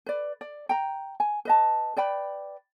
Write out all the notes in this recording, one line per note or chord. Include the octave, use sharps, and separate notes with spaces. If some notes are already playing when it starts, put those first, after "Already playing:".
B4 D5
D5
G5 A#5
G#5
B4 D#5 A5
B4 D5 G5 B5